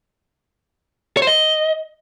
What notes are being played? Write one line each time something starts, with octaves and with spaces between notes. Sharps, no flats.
C#5
C5
D#5